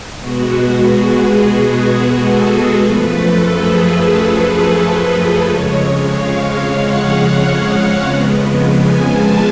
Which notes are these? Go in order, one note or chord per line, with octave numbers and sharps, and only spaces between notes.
B2 G#3 B3 F#4
G#4
G#4
A4
F#2 F3 A3 B4
A4
G#4
G#4
G#4
A4
F2 C#3 G#3 C#5
F5
F#5
F2 C#3 G#3 B3
G#5
A5